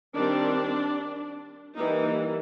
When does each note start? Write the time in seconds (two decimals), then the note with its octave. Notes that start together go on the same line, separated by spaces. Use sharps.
0.14 D#3 G3 C4 D4
1.76 E3 G3 A#3 D#4